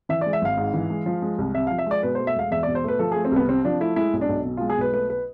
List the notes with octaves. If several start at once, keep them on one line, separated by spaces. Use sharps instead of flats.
E3 E5
D5
G#3
E5
G#1 F5
G#2
E3
G#3
F3
G#3
C2
C3 E5
F5
F3
E5
G#3 D5
B2 B4
C5
A3
E5
E1 F5
E2 E5
D5
B2
C5
A3 B4
F3 A4
G#4
A3
C4
C2 B3
C3 C4
F3 D4
A3 E4
G#3 E4
B1
D4
B1
B2
G#3 F4
G#4
B1 B4
A3 B4
B4